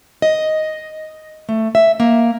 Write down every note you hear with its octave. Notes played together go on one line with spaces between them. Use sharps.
D#5
A3
E5
A#3